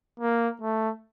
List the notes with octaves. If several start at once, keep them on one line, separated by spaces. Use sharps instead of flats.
A#3
A3